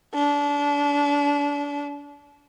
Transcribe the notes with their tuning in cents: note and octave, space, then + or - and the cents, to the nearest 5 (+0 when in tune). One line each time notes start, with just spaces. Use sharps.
D4 -30